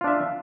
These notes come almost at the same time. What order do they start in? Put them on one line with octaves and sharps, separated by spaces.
F4 D4 E5